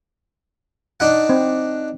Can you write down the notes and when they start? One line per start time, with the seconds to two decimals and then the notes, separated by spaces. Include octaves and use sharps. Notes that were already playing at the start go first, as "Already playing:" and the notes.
1.00 D4 D#4 F#5
1.29 C4